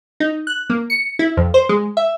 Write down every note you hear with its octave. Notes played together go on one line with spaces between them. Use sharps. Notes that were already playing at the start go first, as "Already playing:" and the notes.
D#4
F#6
A#3
C#7
E4
F2
C5
G#3
E5